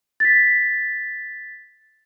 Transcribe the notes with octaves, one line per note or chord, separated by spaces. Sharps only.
A6 B6